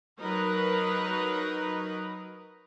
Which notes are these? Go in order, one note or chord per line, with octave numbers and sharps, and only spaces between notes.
F#3 D#4 A#4 B4